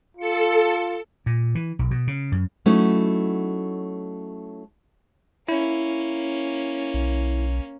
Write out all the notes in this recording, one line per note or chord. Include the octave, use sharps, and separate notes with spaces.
F4 A4 C#7
A#2
E3
B1
B2
C#3
F#2
F#3 A3 C#4 D#4 E4 F#4
A#3 C#4 E4
B1